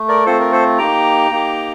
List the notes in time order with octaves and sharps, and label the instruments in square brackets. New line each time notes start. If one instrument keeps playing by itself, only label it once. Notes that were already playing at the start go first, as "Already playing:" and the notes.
Already playing: [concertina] A3
A#4 D5
A3 C4 F4 A4 C5
A#4
A4 C5
A#3 D#4 G4 G5 A#5
A#3 D#4 G4